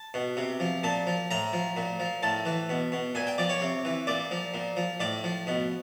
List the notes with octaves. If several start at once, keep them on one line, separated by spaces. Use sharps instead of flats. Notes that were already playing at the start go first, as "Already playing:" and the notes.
Already playing: A5
B2
C3
F3
A#2 A5
F3
A2 A#5
F3
A#2
F3
A2 A5
E3
B2
B2
A#2 G#5
G5
F3 D5
C#5
C3
E3
A#2 D5
F3
A#2
F3
A2 D5
F3
B2